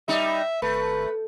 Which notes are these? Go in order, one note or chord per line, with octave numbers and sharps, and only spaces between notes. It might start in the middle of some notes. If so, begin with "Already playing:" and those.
G3 D#4 E5
G#1 A3 B4